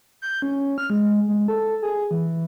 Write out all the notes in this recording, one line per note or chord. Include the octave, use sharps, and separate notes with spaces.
G6
C#4
F6
G#3
G#3
A4
G#4
E3